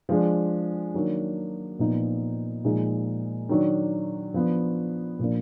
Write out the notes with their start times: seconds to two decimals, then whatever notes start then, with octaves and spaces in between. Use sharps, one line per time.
0.09 F3 G#3 D4
0.94 D#3 F#3 A#3 D4
1.79 A#2 F3 B3 D#4
2.64 A#2 F3 G#3 D#4
3.49 D#3 F#3 D4
4.34 F3 B3 D4
5.19 A#2 F3 A#3 D4